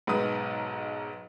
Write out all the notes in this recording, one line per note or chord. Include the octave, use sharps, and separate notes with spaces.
B1 G#2 B4 D#6